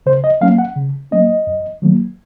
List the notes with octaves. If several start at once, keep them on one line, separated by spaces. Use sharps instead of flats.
C#3 C5
D#5
F#3 A#3 C#4 F5
F#5
C#3
F#3 A#3 C#4 D#5
F#2
D#3 F#3 A#3